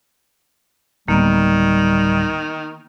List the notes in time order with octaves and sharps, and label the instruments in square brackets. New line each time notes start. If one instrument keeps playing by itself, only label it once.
[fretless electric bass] D1 [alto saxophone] D#3 [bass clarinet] G3 [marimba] A#3 B3